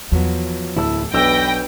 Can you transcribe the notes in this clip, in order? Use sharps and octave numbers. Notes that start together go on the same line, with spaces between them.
E2 F3 F#3 B3
D1 E4 A5 E6
B1 D4 B4 G5 E6 A#6